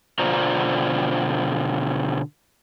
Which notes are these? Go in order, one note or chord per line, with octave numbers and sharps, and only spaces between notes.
B2 D3 F4 C5 D5 A#5